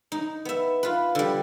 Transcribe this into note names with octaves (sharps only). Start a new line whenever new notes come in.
D#4
B3 E5
F4 B4
D3 G3